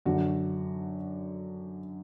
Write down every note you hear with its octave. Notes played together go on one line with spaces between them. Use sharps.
F#2 D3 F#4